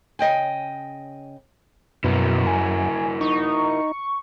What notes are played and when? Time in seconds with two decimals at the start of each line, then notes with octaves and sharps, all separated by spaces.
0.19 C#3 D#5 G5 G#5
2.04 F#2 B2 E4 F#4 A#4
2.47 G#5
3.21 D#4 C#6